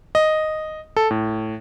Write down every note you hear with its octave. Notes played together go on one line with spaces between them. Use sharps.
D#5
A4
A2